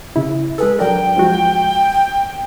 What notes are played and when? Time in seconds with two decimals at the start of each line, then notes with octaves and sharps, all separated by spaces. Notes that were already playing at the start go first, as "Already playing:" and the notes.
0.16 C#3 E4
0.58 G#3 G#4 A4 B4
0.79 F#3 D4 A#4 G5
1.17 F3 G#3 F#4